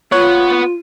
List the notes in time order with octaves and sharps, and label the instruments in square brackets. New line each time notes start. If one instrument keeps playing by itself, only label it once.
[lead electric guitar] B3 F#5 [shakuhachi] F4 [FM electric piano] C#5